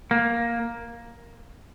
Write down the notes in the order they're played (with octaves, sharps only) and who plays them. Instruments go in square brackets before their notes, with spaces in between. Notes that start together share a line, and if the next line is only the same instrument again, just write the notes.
[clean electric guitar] A#3